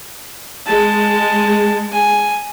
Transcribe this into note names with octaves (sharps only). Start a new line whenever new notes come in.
G#3 A5
G#5